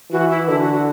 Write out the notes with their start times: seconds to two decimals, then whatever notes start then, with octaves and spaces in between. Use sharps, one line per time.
0.11 E3 F#4
0.30 E4
0.48 D3 E4
0.61 F#4
0.73 F#4